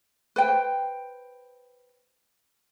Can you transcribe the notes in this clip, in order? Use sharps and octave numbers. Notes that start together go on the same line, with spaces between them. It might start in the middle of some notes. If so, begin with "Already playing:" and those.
B4 C5 G5